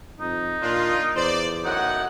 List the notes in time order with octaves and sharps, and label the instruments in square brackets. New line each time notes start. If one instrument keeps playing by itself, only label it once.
[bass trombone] F2 [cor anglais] D#4
[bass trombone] A#2 [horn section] D4 F4
[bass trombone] E2 [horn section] C5 D5
[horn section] F#2 A2 F#5 [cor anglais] D#4